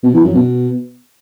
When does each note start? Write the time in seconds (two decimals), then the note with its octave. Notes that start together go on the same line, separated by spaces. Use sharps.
0.03 B2
0.14 E3
0.24 F#2
0.34 B2